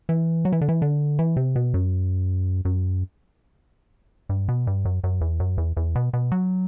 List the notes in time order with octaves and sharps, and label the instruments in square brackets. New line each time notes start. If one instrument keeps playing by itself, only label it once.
[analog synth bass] E3
F#3
E3
D3
E3
D3
E3
C3
B2
F#2
F#2
G2
B2
G2
F#2
F#2
E2
F#2
E2
E2
B2
B2
F#3